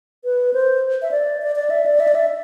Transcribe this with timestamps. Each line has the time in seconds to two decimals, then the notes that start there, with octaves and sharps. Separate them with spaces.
0.24 B4
0.54 C5
1.02 E5
1.11 D5
1.42 D5
1.56 D5
1.70 E5
1.86 D5
2.00 E5
2.08 D5
2.15 E5